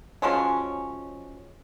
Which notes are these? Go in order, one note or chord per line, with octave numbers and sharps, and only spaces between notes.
F3 F#3 G#3 C#4